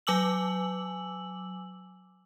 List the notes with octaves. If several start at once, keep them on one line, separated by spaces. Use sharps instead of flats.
F#3 G#5 D6 E6 F#7